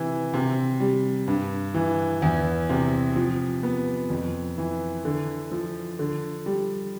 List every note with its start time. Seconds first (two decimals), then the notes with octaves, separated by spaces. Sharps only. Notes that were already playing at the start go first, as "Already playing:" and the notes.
Already playing: C3 E3
0.34 C3
0.80 G3
1.27 G2
1.74 E3
2.22 E2
2.69 C3
3.16 F3
3.63 B3
4.10 F2
4.58 E3
5.05 D3
5.52 F3
5.99 D3
6.46 G3